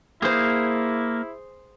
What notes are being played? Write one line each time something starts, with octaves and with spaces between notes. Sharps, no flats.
A#3 E4 G#4 C5